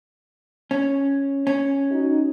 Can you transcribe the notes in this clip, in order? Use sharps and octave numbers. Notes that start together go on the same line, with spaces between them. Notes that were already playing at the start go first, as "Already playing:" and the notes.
C#4
C#4
D#4 F#4